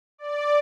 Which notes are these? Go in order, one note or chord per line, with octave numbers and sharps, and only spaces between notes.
D5